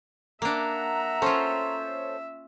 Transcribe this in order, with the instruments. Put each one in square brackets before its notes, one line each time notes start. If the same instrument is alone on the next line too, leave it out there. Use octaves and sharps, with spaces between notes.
[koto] A#3 D4 [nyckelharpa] E5 [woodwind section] F#5 A#5
[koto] C#4 F4 [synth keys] A4 C5 C#5